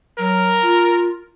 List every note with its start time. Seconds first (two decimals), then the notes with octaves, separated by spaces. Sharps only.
0.18 F#3 A#4
0.62 F4